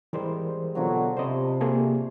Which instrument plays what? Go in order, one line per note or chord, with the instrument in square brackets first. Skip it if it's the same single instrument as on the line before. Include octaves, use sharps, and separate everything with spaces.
[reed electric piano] E3 A#4 C5 [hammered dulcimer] G3 G#3 C4
[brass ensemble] B2 D3 F#3 [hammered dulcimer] F3 D4 F4
[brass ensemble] C3 [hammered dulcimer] D4 B5 [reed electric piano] C5 D#5
[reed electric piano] A#3 G#4 A4 [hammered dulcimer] C5 C#5